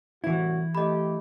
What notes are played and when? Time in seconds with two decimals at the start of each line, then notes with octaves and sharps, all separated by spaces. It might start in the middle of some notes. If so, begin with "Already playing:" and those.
0.24 C2 A2 E3 E4 F#4
0.75 A3 G4 D#5 B5